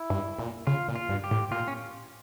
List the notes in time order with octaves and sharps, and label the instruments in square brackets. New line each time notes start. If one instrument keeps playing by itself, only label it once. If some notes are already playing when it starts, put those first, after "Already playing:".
Already playing: [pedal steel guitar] E4
[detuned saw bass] G2
A#2
[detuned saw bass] C#3 [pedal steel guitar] F4
[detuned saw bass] A#2
[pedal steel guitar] F4
[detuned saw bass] G2
[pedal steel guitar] G4
[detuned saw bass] A2
[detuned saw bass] A#2 [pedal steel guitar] F4
[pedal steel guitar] C#4